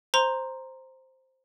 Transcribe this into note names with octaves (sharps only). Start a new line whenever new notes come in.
C5 A#5 C6